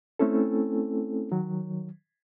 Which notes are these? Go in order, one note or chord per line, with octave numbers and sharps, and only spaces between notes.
A3 C4 C#4 E4 A4
D#3 F#3